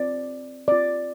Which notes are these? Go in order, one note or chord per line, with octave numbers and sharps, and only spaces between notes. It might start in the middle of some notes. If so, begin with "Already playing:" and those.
Already playing: C4 F4 D5
C4 F4 D5